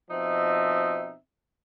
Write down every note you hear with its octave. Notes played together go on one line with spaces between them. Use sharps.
B2 F3 C4 D#4 D#5 E5